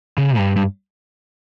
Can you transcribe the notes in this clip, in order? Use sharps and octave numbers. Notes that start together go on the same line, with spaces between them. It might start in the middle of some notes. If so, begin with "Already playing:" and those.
C#3
G2
G2